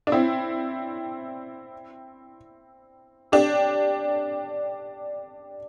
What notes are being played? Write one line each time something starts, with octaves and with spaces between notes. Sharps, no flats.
D4
C4 E4
D4 G4